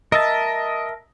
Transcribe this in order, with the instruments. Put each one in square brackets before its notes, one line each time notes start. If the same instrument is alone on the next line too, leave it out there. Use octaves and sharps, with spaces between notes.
[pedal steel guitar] A#4 E5 A5 [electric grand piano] D#5